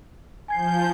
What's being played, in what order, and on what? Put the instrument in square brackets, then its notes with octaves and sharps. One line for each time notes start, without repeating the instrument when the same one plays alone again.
[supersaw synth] F3 G6 [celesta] G#5 G#6 C7